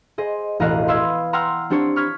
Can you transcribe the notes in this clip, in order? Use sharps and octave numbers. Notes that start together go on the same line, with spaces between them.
G#4 C5 D#5
E1 A1 D#5 F5 A#5 F#6
B4 F5 C6 D#6 E6 G#6
F#5 G5 A#5 C6 E6 F6
C4 D4 G4 C5 C#5
C#6 F6 G#6 B6